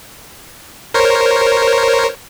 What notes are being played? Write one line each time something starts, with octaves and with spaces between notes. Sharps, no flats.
A#4 C5 C#5